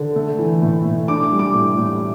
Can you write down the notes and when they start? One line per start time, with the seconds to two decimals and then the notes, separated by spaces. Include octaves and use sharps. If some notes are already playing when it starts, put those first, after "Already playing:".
Already playing: D3
0.16 A3
0.38 E3
0.62 A2
0.85 A2
1.08 D4 D6
1.24 D6
1.32 G3
1.39 D6
1.54 A2
1.78 A2